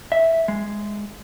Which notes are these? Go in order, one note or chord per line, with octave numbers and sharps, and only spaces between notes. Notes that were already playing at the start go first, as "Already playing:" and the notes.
E5
G#3